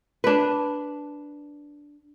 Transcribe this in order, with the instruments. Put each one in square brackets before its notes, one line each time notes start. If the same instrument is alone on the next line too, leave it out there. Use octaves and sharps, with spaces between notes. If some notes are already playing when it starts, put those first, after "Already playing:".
[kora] D4 B4